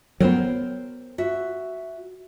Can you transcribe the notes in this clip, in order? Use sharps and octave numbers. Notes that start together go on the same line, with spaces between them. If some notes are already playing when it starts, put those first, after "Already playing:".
F#3 B3 A#4 C5 G5
F#4 E5